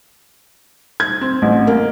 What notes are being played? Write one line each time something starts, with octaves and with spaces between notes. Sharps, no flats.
G#6
C4
A1
A#3